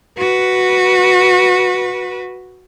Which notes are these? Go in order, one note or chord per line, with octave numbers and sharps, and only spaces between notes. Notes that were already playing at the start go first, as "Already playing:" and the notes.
F#4 B4